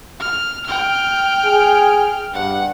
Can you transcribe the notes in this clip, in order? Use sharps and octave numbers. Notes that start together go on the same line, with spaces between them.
F6
G5 F6
G#4
G2 F#5